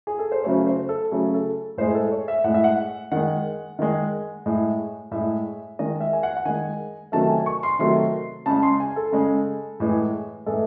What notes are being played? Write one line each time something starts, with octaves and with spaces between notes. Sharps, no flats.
G#4
A4
C5
C#3 F#3 A3 C#5
C5
A4
C#3 F#3 A3 G#4
A4
A2 G#3 C5
G#4
A4
C#5
E5
A2 G#3 F#5
E5
F#5
D#3 G#3 F#5
D#3 G#3
A2 G#3
A2 G#3 E5
D#3 G#3 D#5
E5
G#5
F#5
F#5
D#3 G#3 G#5
C3 D#3 F#3 A3 A5
G#5
C#6
C6
C3 D#3 F#3 A3 C6
C#3 G#3 A5
C6
G#5
A4
C#3 G#3
A2 E3 G#3
A2 E3 G#3 A4